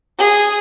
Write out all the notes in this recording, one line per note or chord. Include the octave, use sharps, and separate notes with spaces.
G#4